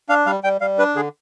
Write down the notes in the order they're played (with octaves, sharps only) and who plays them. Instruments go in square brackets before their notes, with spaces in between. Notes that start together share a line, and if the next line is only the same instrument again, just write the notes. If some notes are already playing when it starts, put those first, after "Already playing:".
[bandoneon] D4 F5
G3 F5
G3 G5
G3 F5
D4 B4
D3 G#4